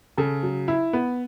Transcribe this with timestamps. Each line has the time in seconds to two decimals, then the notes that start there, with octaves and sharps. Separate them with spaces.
0.17 C#3 A4
0.43 F#3
0.68 E4
0.93 B3